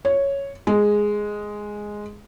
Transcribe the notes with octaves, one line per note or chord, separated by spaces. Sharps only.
C#5
G#3